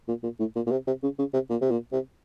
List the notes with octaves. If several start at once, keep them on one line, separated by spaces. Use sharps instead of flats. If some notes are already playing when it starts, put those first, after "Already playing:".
A#2
A#2
A2
A#2
A#2
C3
C3
C#3
C#3
C3
A#2
C3
A#2
C3